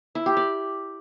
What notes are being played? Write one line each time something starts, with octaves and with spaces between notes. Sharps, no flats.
E4
G4
D5